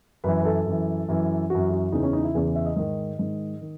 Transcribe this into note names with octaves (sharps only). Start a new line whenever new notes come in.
F#2 E3 B4
B4
A4
F#2 E3
F#2 E3
F#2 E3 F#4
F#4
E2 C#3 E3 D#4
C#4
D#4
E4
E2 C#3 E3 G#4
E5
D#5
G#2 D#3 D#5
G#2 D#3
D#3